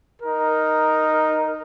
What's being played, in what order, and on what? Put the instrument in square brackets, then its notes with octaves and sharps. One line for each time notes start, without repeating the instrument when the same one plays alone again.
[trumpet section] D#4 A#4